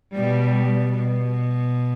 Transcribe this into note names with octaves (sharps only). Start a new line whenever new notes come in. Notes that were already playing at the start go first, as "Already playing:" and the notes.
B2 G3
B2